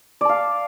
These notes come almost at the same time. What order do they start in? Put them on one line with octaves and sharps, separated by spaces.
D5 A5 F5